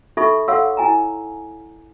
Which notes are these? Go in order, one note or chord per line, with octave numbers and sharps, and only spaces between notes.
D#4 A4 E5 B5 C#6
A4 C#5 F5 F#5 C6 E6
E4 G#5 A#5